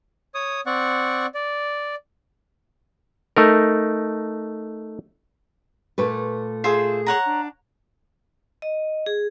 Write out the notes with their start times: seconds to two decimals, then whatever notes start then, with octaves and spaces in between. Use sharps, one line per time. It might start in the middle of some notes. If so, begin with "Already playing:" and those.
0.35 C#5 D#6
0.66 C4 D5 F#5 C#6
1.34 D5
3.37 A3 D#4 A#4
5.98 A#2 A3 B4
6.64 F4 G#4 C5 E5
7.07 C#5 F#5 A#5
7.25 D4
8.62 D#5
9.06 G#4